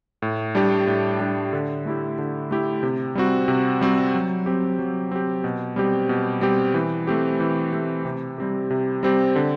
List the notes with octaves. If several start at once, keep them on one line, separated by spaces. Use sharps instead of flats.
A2
G3 D4 G4
A2
G3 D4 G4
D3
A3 E4 G4
D3
A3 E4 G4
C3
G3 C4 F#4
C3
G3 C4 F#4
F#3
C4 G4
F#3
C4 G4
B2
G3 C4 G4
B2
G3 C4 G4
E3
A3 C4 G4
E3
A3 C4 G4
C3
G3 C4 G4
C3
G3 C4 G4
D3